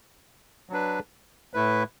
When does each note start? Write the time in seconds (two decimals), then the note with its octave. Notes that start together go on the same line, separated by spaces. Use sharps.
0.70 F#3 D4 B4
1.54 A2 A3 E4 B4